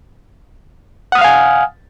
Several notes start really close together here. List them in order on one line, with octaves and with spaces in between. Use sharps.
F#5 D#6 F6 F5 G#5